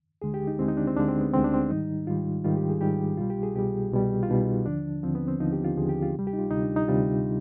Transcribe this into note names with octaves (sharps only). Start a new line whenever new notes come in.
D2 D3 G#3 G#4
G4
D#4
D2 D3 G#3 C4
D#4
D4
C4
D2 D3 G#3 D4
C4
B3
D2 D3 G#3 C4
D4
C4
G#2 D#3 G3 D#4
G#2 D#3 G3 F4
G#2 D#3 G3 F4
G4
G#4
G#2 D#3 G3 G4
C2 B2 G3 F4
G4
G#4
C2 B2 G3 G4
C2 B2 G3
F4
C2 B2 G3 D#4
D#2 D3 F3 D4
D#2 D3 F3 C4
B3
C4
D#2 D3 F3 D#4
G4
F4
D#2 D3 F3 G#4
G4
F4
D2 C3 G3
G4
D#4
F4
D2 C3 G3 D#4
D4
D#4
D2 C3 G3 F4